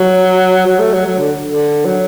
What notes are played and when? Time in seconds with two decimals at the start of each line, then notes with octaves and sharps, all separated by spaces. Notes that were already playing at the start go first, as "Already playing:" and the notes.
Already playing: F#3
0.66 F#3
0.79 A3
0.93 F#3
1.06 F#3
1.19 D3
1.46 D3
1.85 F#3